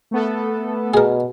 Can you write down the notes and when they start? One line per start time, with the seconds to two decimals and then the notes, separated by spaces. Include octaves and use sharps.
0.11 A3 B3 A4
0.94 B2 G#4 A#4